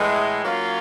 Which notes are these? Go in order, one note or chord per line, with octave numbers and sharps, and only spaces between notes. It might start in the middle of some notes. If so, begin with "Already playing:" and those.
Already playing: A2 E3 G#3
F#3 A#3 C#4 F4